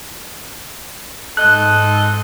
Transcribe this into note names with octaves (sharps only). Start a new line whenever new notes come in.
G#2 C4 A4 D#5 F#6